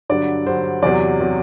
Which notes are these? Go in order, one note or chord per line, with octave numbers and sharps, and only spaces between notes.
G2 D3 F#3 D5
G2 D3 F#3 C5
E2 C3 F#3 D5
C3 F#3